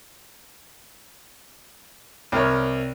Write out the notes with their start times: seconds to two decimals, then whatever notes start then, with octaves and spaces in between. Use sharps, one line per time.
2.32 C2 A#4 C#5